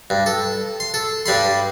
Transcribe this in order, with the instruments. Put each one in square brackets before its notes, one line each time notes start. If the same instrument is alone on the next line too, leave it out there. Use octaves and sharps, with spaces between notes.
[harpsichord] G2
A4
C6
A4
G2 G3 B5 C6